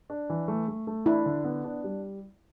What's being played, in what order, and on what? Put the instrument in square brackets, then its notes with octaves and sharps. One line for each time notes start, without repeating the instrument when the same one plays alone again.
[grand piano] D4
E3
A3
A3
A3
[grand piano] D4 [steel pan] E4
[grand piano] D3
B3
D4
G3